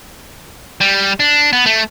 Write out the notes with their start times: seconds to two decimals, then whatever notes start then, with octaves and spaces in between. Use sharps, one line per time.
0.81 G3
1.20 D4
1.53 B3
1.66 A3